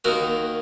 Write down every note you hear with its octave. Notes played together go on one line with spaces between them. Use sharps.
D#2 D#3 F#4 A#4